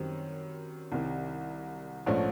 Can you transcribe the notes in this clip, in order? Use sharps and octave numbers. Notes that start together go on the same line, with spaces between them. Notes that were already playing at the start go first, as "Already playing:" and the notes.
Already playing: F#2 D#3 G3 C4
C2 C3 D#3 G3
A#1 G#2 F3 A3 C#4